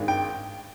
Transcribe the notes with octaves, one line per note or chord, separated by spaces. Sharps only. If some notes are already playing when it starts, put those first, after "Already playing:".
Already playing: G#1 G2 D#3 G#3
G5